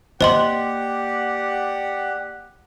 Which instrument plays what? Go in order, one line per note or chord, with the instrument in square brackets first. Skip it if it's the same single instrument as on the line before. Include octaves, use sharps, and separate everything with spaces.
[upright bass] A#3 [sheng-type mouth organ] G4 [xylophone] C5 D#5 C6 [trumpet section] D5 F#5